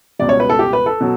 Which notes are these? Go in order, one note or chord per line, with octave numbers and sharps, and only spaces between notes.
C#2 B2 G3 D5
C#5
B4
A4
G4
B4
A4
B2 F#3